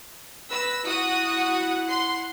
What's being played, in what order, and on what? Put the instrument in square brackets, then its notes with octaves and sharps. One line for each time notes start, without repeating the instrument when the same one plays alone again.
[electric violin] B4 A#6 [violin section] E6
[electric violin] E4 F#5 [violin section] F#4 D#6
[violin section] C6